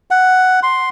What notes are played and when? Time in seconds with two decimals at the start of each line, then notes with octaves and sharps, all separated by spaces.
0.11 F#5
0.63 C6